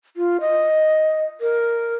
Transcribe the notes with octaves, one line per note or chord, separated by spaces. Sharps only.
F4
D#5
A#4